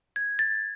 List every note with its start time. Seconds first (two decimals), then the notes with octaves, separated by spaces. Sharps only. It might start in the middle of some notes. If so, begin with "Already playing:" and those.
0.16 G#6
0.39 A6